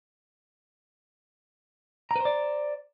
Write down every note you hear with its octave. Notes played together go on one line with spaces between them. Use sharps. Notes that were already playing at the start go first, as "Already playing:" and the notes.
B4 C5 D5 A#5